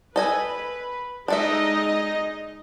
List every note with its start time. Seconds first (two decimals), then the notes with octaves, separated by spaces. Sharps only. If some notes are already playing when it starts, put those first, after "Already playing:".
0.16 A4 B4 D#5 G#5
1.28 G#3 D4 D#4 A4 D#5 E5